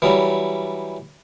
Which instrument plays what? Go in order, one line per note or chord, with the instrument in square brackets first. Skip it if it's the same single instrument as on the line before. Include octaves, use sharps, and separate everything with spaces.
[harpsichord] E3 F#3 G3